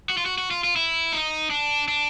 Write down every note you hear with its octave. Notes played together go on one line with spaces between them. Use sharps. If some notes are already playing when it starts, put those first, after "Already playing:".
F#4
F4
F#4
F#4
F4
F4
E4
D#4
D4
D4